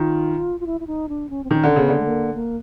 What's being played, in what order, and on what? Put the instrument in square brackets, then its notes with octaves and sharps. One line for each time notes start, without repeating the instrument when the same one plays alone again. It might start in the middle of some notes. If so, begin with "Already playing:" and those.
Already playing: [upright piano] D#3 [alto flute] F4
[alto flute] F4
E4
E4
D#4
D4
C#4
C4
[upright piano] D#3 [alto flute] C#4
[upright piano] D3
[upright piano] C#3 [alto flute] B3
[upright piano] D3
[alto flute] A3
A#3
A#3